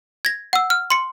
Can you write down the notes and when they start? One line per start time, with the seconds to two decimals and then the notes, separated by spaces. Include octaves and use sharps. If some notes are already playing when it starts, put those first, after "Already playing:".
0.25 G#6 A#6
0.53 F#5 E6
0.70 F6
0.90 C6 C#7